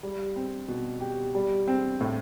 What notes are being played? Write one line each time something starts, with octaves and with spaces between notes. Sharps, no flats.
G3
C4
B2
G4
G3
C4
A2